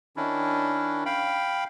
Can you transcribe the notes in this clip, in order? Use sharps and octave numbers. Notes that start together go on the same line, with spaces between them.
D#3 C#4 D4 E4
F5 G5 B5